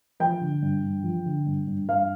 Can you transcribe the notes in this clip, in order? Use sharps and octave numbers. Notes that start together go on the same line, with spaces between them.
F3 G5
D3
G2
G2
F3
D3
G2
G2
G2 F5